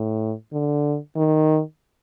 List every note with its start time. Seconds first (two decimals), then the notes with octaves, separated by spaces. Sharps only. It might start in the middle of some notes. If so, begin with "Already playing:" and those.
Already playing: A2
0.53 D3
1.16 D#3